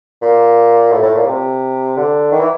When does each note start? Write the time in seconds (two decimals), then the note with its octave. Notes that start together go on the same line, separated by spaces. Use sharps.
0.21 A#2
0.92 A2
1.03 A2
1.15 A#2
1.26 C3
1.97 D3
2.32 D#3
2.40 E3